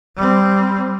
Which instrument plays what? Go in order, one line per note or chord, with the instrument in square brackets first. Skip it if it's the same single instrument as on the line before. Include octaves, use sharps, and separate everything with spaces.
[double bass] G3 C4